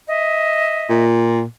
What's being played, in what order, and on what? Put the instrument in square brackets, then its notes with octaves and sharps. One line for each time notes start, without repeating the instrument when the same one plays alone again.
[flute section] D#5 E5
[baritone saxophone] A#2